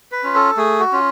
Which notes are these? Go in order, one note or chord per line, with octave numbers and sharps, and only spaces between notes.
B4
C#4 F4
A4
A3 G#4
F#4
C#4 F4